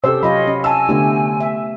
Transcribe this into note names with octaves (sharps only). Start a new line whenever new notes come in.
C3 C#4 G4 A4 C5 E6
F#3 F4 C#5 D#5 B5
C#4
G#5 A5 E6
D3 A3 B3 G4
E5